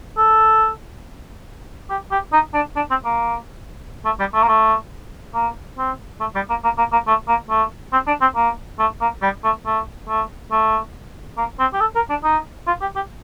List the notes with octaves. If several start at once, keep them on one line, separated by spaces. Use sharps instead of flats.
A4
G4
G4
D#4
D4
D4
C4
A#3
A3
G3
A3
A#3
A3
A#3
C4
A3
G3
A#3
A#3
A#3
A#3
A3
A#3
A3
C4
D4
C4
A#3
A3
A#3
G3
A3
A3
A3
A3
A#3
C4
G4
A4
A#4
D4
D#4
F4
G4
G4